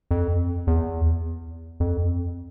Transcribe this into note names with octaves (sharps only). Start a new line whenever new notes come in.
F2
E2
F2